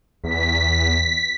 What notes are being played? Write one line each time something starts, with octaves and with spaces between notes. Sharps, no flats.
E2 B6